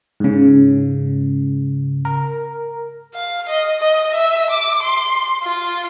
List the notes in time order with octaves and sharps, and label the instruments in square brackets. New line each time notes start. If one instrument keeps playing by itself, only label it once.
[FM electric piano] G#2 C#3
A#4
[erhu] F5
D#5
D#5
E5
D6
C6
F4